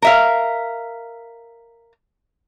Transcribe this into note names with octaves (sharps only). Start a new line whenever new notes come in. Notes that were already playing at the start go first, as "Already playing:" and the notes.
A#4 E5 F5